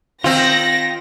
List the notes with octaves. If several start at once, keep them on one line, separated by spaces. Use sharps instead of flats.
D#3 C4 F4 A#6